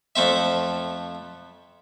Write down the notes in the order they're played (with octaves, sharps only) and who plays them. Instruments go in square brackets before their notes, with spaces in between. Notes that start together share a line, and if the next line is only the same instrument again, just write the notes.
[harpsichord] F2 A3 C4 E5